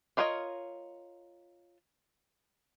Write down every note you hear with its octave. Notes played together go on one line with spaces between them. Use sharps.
D4 F4 A#4 C#5 D#5